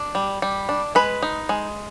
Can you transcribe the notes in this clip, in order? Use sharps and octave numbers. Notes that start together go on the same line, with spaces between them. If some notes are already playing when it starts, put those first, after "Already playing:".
Already playing: D4
G3
G3
D4
G#3 B4
D#4
G#3